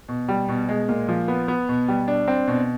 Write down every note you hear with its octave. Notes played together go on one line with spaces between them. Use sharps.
B2
G3
B2
G#3
A#2
F3
B3
B3
B2
G3
D4
C4
B2